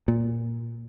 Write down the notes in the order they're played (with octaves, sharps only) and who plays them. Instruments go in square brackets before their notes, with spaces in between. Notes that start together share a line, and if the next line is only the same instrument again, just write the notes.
[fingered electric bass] A#2